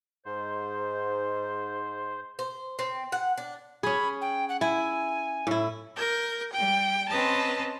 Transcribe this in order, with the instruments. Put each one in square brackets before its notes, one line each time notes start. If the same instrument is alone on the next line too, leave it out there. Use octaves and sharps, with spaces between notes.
[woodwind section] G#2 [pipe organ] C5
[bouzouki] C5
C4
F#5
D4
[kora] C#4 G#4 [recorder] B5
[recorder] G5
F#5
[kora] E4 [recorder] G#5
[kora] A2 E4
[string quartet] A#4 G6
G3 G5
C4 C#4 B4 D#5 A5 A#5